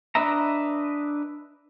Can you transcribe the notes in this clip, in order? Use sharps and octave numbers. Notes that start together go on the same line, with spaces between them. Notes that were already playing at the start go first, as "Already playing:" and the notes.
D4 B4 D#5 E5 A#5